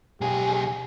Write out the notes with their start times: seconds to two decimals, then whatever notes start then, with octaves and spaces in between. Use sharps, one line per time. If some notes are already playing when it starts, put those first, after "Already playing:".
0.21 B1 G4 G#4